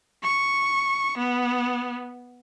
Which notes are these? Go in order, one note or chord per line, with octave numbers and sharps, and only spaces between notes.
C#6
B3